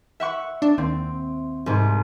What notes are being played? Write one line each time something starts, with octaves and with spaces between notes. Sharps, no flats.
E5 F#5 C#6
D4
D#2 C4
C2 G#2